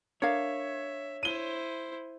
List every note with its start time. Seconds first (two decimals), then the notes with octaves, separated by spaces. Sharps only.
0.22 D4 A#4 C#5 E5 F5 G#6
1.23 E4 C5 D#7 G7